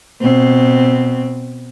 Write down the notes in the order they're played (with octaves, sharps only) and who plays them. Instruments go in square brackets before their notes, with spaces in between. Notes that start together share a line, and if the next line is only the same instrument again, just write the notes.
[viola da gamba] B2 C4